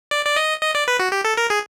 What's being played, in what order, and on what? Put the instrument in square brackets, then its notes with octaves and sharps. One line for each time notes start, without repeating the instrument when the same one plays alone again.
[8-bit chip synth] D5
D5
D#5
D#5
D5
B4
F#4
G4
A4
A#4
G#4